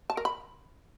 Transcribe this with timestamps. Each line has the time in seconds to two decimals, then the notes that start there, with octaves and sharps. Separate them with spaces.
0.10 A5
0.17 A#4
0.25 B5